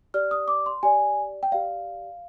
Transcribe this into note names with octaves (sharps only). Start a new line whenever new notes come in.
G4 D5 F6
D#6
D6
C6
G4 D5 G#5
G5
G4 D5 F5